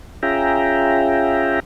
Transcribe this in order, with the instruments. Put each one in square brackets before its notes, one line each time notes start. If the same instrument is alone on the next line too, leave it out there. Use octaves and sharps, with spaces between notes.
[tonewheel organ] C#4 F4 G#4 E5 G5 A#5